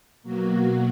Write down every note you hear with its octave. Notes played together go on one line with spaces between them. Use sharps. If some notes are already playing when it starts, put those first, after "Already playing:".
B2 F#3 A#3 F#4